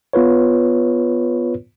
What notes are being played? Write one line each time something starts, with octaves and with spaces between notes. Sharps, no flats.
B3 F4 B4 C#5